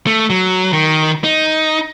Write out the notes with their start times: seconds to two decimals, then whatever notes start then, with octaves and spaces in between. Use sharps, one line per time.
0.07 A3
0.30 F#3
0.73 D#3
1.24 D#4